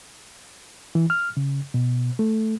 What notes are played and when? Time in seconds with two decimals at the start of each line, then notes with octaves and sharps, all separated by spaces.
0.95 E3
1.10 F6
1.37 C#3
1.74 B2
2.19 A3